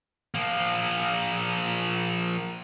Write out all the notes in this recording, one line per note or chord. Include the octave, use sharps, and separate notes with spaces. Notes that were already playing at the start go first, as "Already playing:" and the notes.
F3 A#3